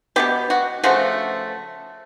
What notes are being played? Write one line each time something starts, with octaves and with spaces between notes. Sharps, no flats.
B2 F#3 B3 G4
F#4
C#3 F3 A3 F#4